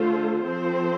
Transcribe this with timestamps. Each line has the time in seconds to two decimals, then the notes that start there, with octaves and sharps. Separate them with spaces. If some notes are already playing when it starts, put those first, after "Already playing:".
Already playing: D3 A3 F4 A4 C5
0.43 F3 C4 A4 C5